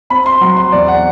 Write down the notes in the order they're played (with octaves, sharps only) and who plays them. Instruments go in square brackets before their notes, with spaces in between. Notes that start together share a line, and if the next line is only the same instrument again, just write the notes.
[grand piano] C4 B5
C6
F#3 C6
C6
E2 D5
F#5